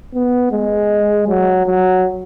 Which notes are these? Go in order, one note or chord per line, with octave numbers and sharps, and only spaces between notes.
B3
G#3
F#3
F#3